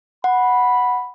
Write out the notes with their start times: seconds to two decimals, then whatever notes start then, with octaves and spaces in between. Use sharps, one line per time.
0.24 F#5 B5